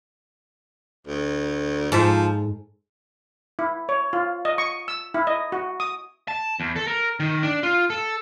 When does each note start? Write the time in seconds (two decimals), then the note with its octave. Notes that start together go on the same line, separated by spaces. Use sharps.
1.07 D2
1.92 G#2 F3 A4 E5
3.59 E4
3.89 C#5
4.13 F4
4.45 D#5
4.58 C#6
4.88 E6
5.14 E4
5.27 D#5
5.52 F#4
5.80 D#6
6.28 A5
6.60 E2
6.76 A4
6.87 A#4
7.20 D#3
7.43 D4
7.63 F4
7.90 A4